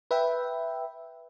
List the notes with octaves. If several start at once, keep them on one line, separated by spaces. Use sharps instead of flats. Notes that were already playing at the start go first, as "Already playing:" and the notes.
B4 E5 G5